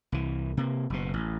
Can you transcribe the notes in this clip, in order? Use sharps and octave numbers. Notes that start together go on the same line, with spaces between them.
C2 E3
C3 A#3
F#1 B2
A1